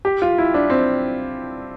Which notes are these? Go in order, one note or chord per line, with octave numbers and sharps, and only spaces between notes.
G4
F4
E4
D4
C4